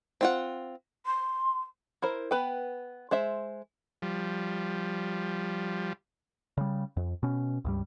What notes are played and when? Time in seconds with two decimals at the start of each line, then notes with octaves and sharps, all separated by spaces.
0.21 C4 F4 F#5
1.06 C6
2.02 E4 A#4 C5
2.31 B3 B4 G5
3.11 G#3 C5 E5
4.02 F3 G3
6.57 C#3 G3
6.97 F2
7.23 B2 C#4
7.65 C#2 G2 G3